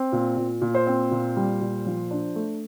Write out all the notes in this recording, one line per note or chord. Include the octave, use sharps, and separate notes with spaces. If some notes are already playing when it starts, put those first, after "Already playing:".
Already playing: C4
A#2
A#2
A#2
C5
C4
A#2
G3
A#2
F3
D4
A3